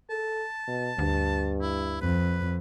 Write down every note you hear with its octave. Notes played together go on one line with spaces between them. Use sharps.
A4 A5
B2
D2 G2
E4
F2 B4